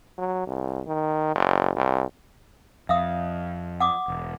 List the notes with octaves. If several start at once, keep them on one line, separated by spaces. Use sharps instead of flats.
F#3
C2
D#3
F#1
C2
F2 E5 F5 D#6
F#5 D6 D#6
E1